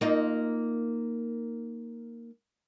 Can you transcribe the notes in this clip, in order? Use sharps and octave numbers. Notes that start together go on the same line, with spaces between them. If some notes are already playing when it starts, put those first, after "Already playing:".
A#3 D#4 F4